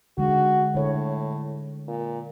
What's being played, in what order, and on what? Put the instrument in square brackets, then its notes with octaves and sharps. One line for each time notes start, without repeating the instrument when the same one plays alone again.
[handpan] D3 G#3 [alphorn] F#4
[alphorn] A2 [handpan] D3 C#5
[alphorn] A#2